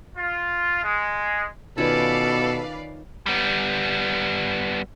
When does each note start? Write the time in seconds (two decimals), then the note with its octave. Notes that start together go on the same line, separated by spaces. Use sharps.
0.17 F4
0.83 G#3
1.78 B2 D#3 C#4 F4 A4 B4 D5 F5
3.26 G3 B3